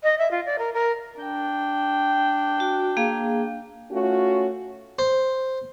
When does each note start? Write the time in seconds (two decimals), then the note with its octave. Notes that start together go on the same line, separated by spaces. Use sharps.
0.03 D#5
0.18 E5
0.31 F4
0.46 D5
0.59 A#4
0.74 A#4
1.20 D4 G5
2.60 F#4
2.97 A#3 G#4 F5
3.91 A3 C#4 F4 F#4
4.99 C5